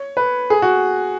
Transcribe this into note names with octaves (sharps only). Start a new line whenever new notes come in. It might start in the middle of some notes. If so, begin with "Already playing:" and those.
Already playing: C#5
B4
G#4
F#4